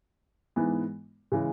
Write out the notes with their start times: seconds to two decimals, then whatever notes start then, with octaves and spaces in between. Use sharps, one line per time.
0.56 G#2 E3 B3
1.32 C#3 E3 G#3